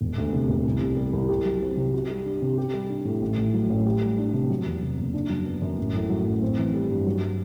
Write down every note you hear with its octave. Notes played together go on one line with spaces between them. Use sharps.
E1
D2
C3
E1
C2
C3
G3
C2
G4
F#3
C4
C3
F#4
G3
D4
C3
G4
G3
D4
A2
A1
A2
F#3
A1
G4
G3
D4
C3
F#3
E2
C3
F#1
D4
F#3
B3
F#2
A1
A2
F#3
A1
C4
E3
G3
G2
F#3